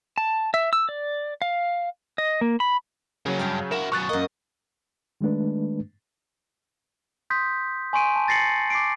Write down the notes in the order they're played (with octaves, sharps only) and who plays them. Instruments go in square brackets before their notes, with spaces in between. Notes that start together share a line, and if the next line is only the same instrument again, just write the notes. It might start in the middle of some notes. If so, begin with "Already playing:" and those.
[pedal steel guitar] A5
E5
E6
D5
F5
D#5
A#3
B5
[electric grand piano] C#3 F#3 [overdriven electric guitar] A#3 C#4
[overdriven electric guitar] G2 [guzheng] F5 G5
[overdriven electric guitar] E4 F#4 [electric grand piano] A#4 E7
[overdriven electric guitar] F#2 B2 [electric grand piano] C#6 F#6 A6
[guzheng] F#2 A#3 [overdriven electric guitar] D#5
[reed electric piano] D#3 G#3 A3 D4 B4
[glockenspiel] C6 D#6 G6 B6
G#5 C6 C#6 D7 D#7
A5
A6 A#6 C7 C#7 F#7
D6 C7 D7